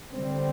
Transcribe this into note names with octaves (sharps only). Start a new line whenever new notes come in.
D3 G3 C4